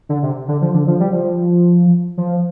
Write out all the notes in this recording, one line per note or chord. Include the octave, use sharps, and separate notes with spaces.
D3
C3
D3
F3
D3
F3
G3
F3
F3